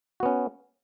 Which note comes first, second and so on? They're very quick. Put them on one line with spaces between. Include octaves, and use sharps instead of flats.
F#4 B3 C#4